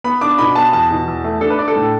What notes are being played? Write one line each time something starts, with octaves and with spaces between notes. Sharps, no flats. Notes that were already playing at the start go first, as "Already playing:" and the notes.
B3 B5
D4 D6
B2 B5
B3 A5
E2 A5
B2
E2
A3
D4 A4
B4
D4 D5
A4
A2